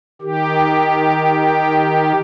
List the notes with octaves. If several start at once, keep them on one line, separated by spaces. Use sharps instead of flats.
D#3 G4